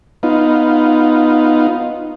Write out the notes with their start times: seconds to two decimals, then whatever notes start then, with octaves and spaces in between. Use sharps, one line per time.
0.23 B3 D#4 F4